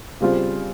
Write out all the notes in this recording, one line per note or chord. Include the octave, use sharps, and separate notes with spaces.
C#3 G3 C4 F4